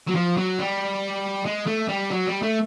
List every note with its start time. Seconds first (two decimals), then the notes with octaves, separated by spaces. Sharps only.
0.08 F#3
0.16 F3
0.37 F#3
0.59 G3
1.46 G#3
1.67 A3
1.88 G3
2.10 F#3
2.26 G3
2.42 A3